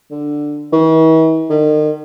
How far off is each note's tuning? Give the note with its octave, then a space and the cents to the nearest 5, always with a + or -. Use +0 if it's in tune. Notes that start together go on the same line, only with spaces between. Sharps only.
D3 +5
E3 -45
D#3 -40